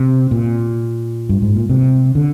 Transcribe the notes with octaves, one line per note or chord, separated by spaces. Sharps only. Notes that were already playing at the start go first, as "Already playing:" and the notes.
Already playing: C3
A#2
G2
G#2
A#2
C3
D3